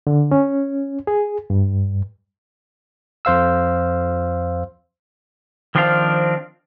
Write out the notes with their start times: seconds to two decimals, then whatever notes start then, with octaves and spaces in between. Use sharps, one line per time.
0.07 D3
0.31 C#4
1.07 G#4
1.50 G2
3.25 F2 C5 F5 E6
5.75 D#3 F3 C4 D4 C5 F5